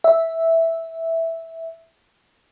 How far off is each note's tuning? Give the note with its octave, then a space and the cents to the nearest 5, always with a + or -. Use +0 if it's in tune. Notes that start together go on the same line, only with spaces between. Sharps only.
E5 -5